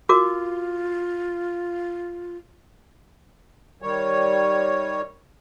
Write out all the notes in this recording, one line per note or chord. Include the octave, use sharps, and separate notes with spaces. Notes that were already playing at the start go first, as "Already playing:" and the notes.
F4 F#4 A#4 D6
D#3 G3 C#5